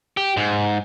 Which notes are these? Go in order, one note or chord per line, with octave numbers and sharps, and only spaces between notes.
G4
G#2